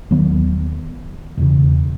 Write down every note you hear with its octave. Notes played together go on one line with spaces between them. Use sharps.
D#2 D#3 F#3 B3
E1 E2 C#3